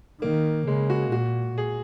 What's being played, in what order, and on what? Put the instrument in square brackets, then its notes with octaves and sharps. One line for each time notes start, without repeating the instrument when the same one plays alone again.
[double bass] D#3 [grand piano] A#3
[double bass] C#3 [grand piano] G#3
[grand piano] F#4
[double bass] A#2 [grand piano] F#4
[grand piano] G#4